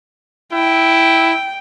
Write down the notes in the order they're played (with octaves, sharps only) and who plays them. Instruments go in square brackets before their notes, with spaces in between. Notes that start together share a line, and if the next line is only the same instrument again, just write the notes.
[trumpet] E4 [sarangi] G5